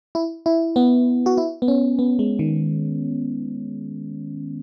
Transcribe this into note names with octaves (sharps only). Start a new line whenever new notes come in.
E4
E4
B3
F#4
E4
B3
C#4
B3
G#3
D#3